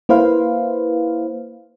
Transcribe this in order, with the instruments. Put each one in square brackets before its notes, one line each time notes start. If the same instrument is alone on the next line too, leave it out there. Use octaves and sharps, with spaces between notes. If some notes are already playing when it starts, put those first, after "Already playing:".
[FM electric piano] A#3 E4 B4 C5 F5